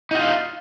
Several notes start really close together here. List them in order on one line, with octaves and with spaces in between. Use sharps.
D#4 F#4 F4